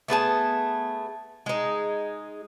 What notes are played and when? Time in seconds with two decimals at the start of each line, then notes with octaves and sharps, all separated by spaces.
0.08 A3 B3 G#4 A5
1.46 G#3 D#4